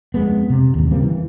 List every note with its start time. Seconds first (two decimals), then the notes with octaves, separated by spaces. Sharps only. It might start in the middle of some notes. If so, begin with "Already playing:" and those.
0.14 F2 G#3 B3
0.50 C3
0.75 A1 D#2
0.91 C#3 G3 A#3 C4
1.03 E3